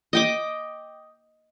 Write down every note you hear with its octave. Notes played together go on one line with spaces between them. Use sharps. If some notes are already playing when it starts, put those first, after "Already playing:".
D#5 G5 D6